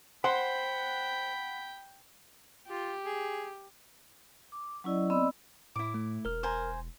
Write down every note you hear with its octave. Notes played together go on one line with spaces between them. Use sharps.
C5 F#5 G5 B5
F4 G4
G#4
D6
F#3 C#4 E4 D5 D#5
B3 C4 D5 D#5 B5 E6
A2 E4 D6
A3
E1 A#4 F6
C5 G#5 A#5